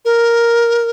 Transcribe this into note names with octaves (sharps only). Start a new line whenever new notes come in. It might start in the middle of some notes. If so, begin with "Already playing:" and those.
A#4